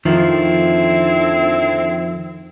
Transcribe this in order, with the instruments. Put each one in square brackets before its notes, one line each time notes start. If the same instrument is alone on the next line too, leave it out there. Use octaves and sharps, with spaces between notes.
[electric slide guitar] F2 D#3 F3 [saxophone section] D3 C4 E4